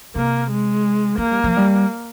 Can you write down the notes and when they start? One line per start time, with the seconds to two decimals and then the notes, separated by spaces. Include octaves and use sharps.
0.15 C3 A#3
0.50 G#3
1.18 G#3 A#3
1.31 G3
1.44 F3
1.57 G3